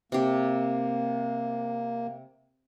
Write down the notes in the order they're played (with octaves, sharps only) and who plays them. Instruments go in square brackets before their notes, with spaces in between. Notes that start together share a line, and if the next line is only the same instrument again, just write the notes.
[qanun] C3 G4 [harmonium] A#3